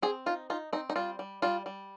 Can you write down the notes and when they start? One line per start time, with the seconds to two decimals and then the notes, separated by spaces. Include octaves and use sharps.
0.02 C4 G#4
0.26 D#4 F4
0.50 D#4 F4
0.73 C4 D#4
0.90 D#4
0.96 G3 F4
1.19 G3
1.42 G3 F4
1.66 G3